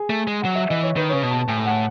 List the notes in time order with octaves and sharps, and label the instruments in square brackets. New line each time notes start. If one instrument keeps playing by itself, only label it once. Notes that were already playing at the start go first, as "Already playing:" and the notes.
Already playing: [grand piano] G#4
[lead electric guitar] A3
G#3
[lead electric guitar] F#3 [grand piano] F#5
[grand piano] E5
[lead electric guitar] E3 [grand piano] D#5
[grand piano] C#5
[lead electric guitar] D#3 [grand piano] B4
[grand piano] C#5
[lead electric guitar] C#3 [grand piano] B4
[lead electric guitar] B2
[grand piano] A5
[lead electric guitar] A2 [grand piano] G#5
[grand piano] F#5